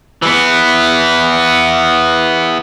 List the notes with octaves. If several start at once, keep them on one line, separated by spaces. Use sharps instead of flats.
E3 B3